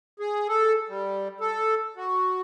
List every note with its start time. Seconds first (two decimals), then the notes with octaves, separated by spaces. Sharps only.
0.20 G#4
0.48 A4
0.89 G3
1.40 A4
1.96 F#4